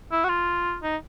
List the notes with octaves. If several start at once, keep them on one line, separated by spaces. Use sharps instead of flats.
E4
F#4
F4
D#4